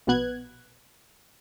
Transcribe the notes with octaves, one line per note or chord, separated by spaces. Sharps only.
A#1 B2 B3 F#6 G#6